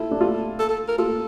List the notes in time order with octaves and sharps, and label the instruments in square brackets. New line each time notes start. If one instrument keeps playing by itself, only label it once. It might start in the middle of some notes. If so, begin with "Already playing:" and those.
Already playing: [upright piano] E4 F4 [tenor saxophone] A4
[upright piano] D4
F4
[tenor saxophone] A4
A4
A#4
[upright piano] F4 [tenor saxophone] A4